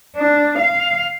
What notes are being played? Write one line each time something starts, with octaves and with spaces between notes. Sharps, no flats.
D4
F5